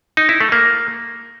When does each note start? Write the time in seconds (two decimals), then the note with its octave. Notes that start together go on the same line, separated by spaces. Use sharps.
0.17 D#4
0.29 E4
0.41 A3
0.52 A#3